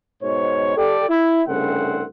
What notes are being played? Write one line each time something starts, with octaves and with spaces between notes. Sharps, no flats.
G#2 B2 C5 C#5
G4 A4 D5
E4
C2 G2 C#3 A3 C4 F#5